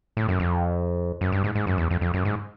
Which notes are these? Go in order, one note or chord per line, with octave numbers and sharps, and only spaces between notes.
A2
F#2
F2
F#2
G2
G#2
G#2
F#2
E2
F2
F2
F#2
G#2